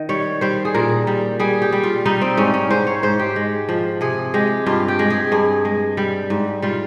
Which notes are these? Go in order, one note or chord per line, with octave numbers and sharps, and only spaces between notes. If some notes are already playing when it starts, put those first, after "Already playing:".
Already playing: D#3
G3 C#5
G3 C5
G#4
A#2 A#4
G3
G3 G#4
G4
G3
F4
G3 D#4
C4
G#2 C#4
C#4
G#2 C5
C#5
G#2 C5
G4
G#3
F3
C3 G#4
G#3 G4
G2 F4
G4
G#3
G#4
G2 G#4
G#3
G3
G#2
G3 F4